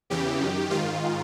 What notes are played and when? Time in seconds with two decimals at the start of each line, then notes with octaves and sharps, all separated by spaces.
0.10 E2 C#3 E3 G4
0.40 F#2 D#3
0.71 G#2 D#3 F4